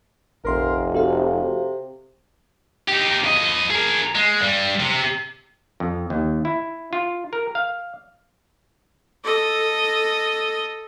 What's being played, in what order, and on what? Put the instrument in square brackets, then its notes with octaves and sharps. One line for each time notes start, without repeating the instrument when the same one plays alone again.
[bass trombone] F1 [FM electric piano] A#1 C6 [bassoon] A#4
[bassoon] C3 [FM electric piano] F#4 A4 F5
[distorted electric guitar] D#4 G4
F3 D#5
G#4 A#4
G#3
G2 G3
C3
[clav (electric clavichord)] F2
D#2
E4
F4
A#4
F5
[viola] A4 D#5